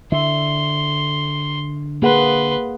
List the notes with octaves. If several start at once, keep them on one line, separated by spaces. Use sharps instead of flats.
D3 E5 C6
A#3 G#4 B4 F#5 C6